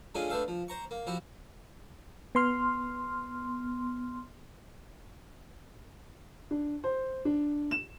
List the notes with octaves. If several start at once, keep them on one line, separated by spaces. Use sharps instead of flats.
G#3 A3 C#4 D4 F4 G#4
A3 B3 D4 C5 E5 F5
F3
C5 A#5 C#6
A#3
F3 E4 F#4 G4
B3 C6 F6
D4
C5
D4
E7